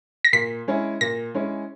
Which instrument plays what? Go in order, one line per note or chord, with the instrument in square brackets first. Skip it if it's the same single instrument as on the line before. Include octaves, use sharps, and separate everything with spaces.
[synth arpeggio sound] A#6
[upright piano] A#2 [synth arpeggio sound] B6
[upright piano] G#3 C#4 E4
[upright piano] A#2 [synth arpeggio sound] A#6
[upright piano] G#3 C#4 E4